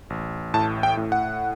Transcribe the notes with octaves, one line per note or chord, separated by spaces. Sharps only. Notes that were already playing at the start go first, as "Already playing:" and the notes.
A1
A2 A5
G5
A2
F#5